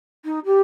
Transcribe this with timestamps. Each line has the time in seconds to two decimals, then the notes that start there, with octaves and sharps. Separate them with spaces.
0.25 D#4
0.45 G4